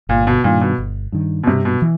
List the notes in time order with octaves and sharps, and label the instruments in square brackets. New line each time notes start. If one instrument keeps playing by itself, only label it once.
[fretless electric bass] G1 [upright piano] A#2
[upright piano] B2
[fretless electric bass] G2 D#3 [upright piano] A#2
[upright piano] B2
[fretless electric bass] G1
G2 D#3
[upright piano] B2
[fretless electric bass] G2 [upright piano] C3
[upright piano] B2
[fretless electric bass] E3